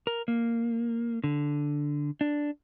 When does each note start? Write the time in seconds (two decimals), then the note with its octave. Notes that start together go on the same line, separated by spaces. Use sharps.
0.07 A#4
0.28 A#3
1.24 D3
2.21 D4